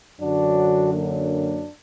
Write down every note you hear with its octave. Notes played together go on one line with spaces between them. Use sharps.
F#2 D3 F#3 D4 F#4
A#3 D4